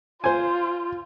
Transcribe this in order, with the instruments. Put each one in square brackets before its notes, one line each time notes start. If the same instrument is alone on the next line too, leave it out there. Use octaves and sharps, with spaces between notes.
[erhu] F4 [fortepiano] C5 G#5